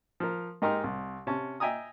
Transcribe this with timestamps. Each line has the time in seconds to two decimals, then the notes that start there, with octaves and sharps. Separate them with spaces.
0.20 F3 A#4
0.62 G#2 D#4 G4 A#4 C6
0.84 C2
1.27 C3 C#4 A5
1.60 D#5 E5 G5 G#5 A#5 D#6